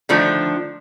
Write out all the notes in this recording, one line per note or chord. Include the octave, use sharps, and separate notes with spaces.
D3 D#3 F3 A3 D4